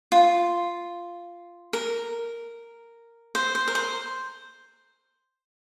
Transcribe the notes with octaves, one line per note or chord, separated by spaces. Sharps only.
F4
A#4
C5
C5
A#4
C5